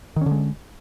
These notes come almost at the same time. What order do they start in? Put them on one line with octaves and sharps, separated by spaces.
D#3 C#4 D3 G#3